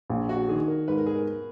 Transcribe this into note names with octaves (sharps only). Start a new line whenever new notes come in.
A#1
F#4
D#3 G#4
A#4
G#2 B4
A#4
G#4
A#4